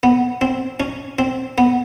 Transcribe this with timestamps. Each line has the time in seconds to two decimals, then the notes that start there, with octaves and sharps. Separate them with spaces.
0.03 B3
0.41 C4
0.80 C#4
1.19 C4
1.58 B3